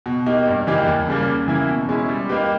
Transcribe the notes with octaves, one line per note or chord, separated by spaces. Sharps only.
B2
A#3 D#4 G4
G2
E3 A#3 D#4 G4
D#2
C#3 G3 A#3
C#3
E3 A#3 E4
B2
G#3 C#4 E4
G3
A#3 D#4 G4 B4